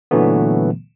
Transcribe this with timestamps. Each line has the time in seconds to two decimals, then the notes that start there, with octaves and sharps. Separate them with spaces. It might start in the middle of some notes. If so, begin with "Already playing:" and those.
0.11 A#2 D3 E3 F#3 A3 B3